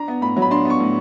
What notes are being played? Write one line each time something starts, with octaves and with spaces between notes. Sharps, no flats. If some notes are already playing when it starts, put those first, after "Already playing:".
Already playing: D4 A#5
B3
A2 B5
F#3
B5
D4 C6
B3 C#6
A2